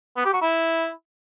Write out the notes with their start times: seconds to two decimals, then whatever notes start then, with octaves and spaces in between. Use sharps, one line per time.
0.17 B3
0.25 G4
0.33 F#4
0.42 E4